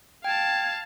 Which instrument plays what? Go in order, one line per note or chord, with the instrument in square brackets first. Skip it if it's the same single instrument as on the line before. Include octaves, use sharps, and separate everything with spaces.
[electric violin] F5 A5 [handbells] G5 [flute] G#6